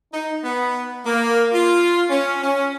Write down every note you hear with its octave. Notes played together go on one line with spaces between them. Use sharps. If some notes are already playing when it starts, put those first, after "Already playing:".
D#4
B3
A#3
F4
C#4
C#4